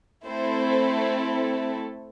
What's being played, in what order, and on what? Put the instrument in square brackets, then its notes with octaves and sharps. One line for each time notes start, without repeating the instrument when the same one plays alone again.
[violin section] A3 C4 E4 A4 C5